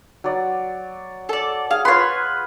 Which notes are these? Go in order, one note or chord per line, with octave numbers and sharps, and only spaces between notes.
F#3 D5
A4 D5
G#4 F5
F4 B4 C#5 C6